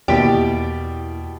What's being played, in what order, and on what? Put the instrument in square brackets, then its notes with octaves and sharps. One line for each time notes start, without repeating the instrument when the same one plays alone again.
[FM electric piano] E2 A#3 E4 [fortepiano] B2 D5 [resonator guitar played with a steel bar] G4